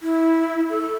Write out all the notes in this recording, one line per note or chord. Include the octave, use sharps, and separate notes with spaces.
E4
A4